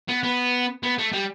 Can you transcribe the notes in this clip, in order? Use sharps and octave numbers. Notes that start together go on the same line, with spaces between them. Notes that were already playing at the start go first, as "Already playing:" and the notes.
B3
B3
B3
A3
G3